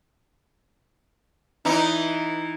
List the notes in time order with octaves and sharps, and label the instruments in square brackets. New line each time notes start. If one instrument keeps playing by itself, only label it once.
[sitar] E3 D#4